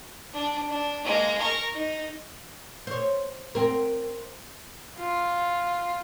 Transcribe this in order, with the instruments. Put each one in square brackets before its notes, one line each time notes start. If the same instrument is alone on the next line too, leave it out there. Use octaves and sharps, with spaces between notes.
[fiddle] D4
D4
G#3 A#3
A#4 C#6
D#4
[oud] C5 C#5
C4 A#4
[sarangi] F4